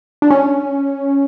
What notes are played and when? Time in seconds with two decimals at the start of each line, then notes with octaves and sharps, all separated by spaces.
0.22 D4
0.30 C#4